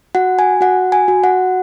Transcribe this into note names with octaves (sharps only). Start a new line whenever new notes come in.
F#4 F#5
G#5
F#4 F#5
G#5
F#4
F#5